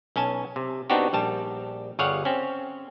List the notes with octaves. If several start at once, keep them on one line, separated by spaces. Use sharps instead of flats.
B1 C#4 G#5 A5
C3
B3 C4 D4 D#4 F#4 G4
A#1 G3 A5
G1 G3 G#4 C#5 F5 F#5
C4 C#4